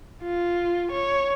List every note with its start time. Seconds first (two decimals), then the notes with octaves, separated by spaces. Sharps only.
0.23 F4
0.92 C#5